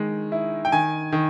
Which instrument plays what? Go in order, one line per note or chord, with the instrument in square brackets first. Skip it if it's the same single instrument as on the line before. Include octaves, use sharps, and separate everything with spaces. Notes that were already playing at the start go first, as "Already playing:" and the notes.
Already playing: [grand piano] D#3 G#3
E4
G5
D#3 G#5
D#3